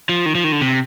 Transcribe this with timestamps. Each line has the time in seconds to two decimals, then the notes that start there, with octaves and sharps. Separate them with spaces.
0.09 F3
0.26 D#3
0.35 F3
0.44 D#3
0.52 D3
0.61 C3